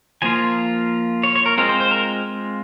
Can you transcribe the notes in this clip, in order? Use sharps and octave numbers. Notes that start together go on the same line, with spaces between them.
F3 A#3 F4 G#5
C#5
C#5
A#4
G#3 C4 F4 A#4
C5
C5
A#4